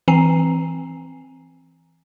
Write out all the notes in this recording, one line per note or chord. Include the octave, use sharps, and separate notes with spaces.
E3 C4 G#5 A#5 C7